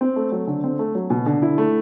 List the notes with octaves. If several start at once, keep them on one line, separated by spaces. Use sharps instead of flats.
C4
A3
F#3
D3
C4
A3
F#3
B2
D3
E4
A3